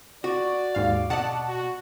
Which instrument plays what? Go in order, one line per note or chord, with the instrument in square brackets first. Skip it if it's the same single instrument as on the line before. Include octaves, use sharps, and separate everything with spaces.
[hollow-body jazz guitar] F#4 [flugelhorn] D5
[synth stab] D#2 G#2 F5
[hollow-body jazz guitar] B2 D5 [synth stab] F#5 A5
[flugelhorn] F#4